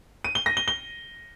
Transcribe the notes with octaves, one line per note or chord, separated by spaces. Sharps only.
D#7
G7
A#6
G7
G7